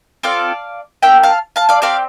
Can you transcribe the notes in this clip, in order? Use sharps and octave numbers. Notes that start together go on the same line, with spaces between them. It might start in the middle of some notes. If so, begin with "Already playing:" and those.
C4 F4 A4 D5 F5
A#3 D4 G4 E5 G5
F5 A5
F5 A5
D5 F5
C4 G4 D5 F5